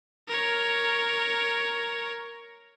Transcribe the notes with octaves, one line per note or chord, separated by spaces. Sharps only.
A#4 C#5